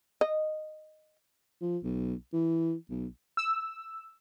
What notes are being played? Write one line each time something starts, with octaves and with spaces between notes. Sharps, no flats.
D#5
F3
B1
E3
B1
E6